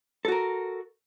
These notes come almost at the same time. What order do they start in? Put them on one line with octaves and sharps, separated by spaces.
A4 F#4 A#4